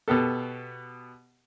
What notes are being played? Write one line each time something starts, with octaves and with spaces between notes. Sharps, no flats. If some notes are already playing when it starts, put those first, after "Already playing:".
B2 B3 G4 A4